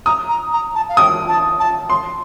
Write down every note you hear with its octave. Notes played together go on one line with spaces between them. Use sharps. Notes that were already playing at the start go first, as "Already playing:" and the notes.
A#5 D#6
A#5
A#5
A5
F5
G5 D#6
A5
A5
C6